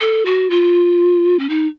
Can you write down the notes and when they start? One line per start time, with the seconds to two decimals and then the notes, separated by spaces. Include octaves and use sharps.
0.01 A4
0.25 F#4
0.50 F4
1.39 C#4
1.49 D#4